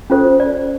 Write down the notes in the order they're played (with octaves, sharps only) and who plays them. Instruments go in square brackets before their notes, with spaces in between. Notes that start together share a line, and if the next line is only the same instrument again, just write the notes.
[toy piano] C#4 F4 A4 C5
D5